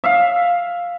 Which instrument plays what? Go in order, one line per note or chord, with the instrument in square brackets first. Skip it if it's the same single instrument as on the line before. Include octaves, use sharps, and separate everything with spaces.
[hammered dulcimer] E5 F5